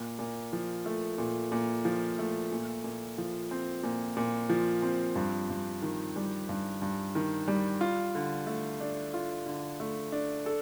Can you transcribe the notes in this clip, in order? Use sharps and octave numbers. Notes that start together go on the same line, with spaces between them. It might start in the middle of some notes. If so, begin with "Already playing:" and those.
Already playing: A#2
A#2
F3
A3
A#2
A#2
F3
A3
A#2
A#2
F3
C4
A#2
A#2
F3
C4
G2
G2
D#3
G3
G2
G2
D#3
G3
F4
D3
A3
D4
F4
D3
A3
D4
A4